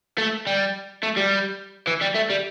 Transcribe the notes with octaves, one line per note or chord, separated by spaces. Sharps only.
A3
G3
A3
G3
E3
G3
A3
G3